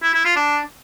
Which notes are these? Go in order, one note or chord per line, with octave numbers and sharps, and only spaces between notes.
E4
E4
F4
D4